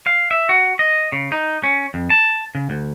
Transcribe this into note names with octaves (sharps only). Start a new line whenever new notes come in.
F5
E5
F#4
D#5
C#3
D#4
C#4
F2
A5
C#3
D2